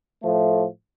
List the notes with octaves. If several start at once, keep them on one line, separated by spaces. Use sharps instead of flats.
A2 F3 A3